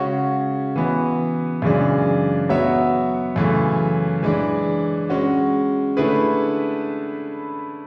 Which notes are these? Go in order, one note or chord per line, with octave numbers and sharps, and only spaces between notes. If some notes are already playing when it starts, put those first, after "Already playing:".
Already playing: C#3 G#3 C#4 F#4
E3 B3 F#4
F#2 C#3 E3 G#3 D4
F#3 B3 F#4 C#5 E5
F#2 C#3 E3 A3
E3 G#3 D4
G#3 C#4 F#4
D3 A3 E4 G#4 B4